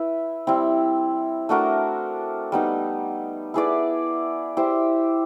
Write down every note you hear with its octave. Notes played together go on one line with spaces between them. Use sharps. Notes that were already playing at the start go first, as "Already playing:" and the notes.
Already playing: E4 B4 E5
G3 C4 E4
A3 D4 F#4 A#4
G3 B3 D#4
E4 G#4 B4 D5
E4 G4 C5